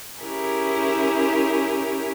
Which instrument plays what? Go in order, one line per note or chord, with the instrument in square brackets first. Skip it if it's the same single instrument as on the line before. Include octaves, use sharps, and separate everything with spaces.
[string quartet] C#4 E4 G4 G#4 A#4